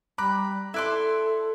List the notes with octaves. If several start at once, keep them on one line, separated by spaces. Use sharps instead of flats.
G3 A#5 B5 D6 F#6
E4 A4 D5 E5 C6 F#6